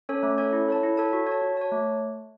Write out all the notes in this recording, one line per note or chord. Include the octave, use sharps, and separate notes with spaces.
C#4 A4 C#5
A3
C#4 A4 C#5
E4
A4 C#5 A5
E4
A4 C#5 A5
F#4
C#5 A5
F#4
C#5 A5
A3